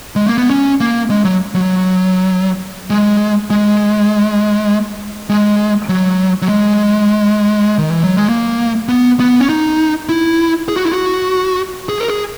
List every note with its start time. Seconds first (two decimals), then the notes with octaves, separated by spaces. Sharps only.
0.16 G#3
0.26 A#3
0.38 B3
0.50 C#4
0.80 A#3
1.10 G#3
1.25 F#3
1.55 F#3
2.90 G#3
3.50 G#3
5.29 G#3
5.89 F#3
6.42 F#3
6.49 G#3
7.78 D#3
7.91 E3
8.03 F#3
8.17 G#3
8.29 A#3
8.88 B3
9.20 B3
9.40 C#4
9.49 D#4
10.09 E4
10.68 G#4
10.76 F#4
10.85 E4
10.92 F#4
11.89 G#4
12.00 A#4
12.08 G#4